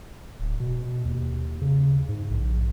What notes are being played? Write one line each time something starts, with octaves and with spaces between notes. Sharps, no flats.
D1
B2
D#2
C#3
G#2
A#1